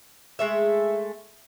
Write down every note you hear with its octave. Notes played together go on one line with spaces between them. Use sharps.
G#3 A3 E5